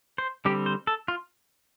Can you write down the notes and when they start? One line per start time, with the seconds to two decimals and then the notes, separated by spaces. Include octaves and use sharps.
0.18 C5
0.45 D3 G3 C4 G4
0.66 C5
0.87 A4
1.08 F4